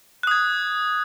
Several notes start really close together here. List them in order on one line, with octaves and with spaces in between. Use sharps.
F#6 D#6 G#6